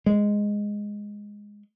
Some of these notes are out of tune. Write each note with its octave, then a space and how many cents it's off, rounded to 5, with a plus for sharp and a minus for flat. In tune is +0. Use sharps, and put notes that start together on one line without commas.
G#3 -5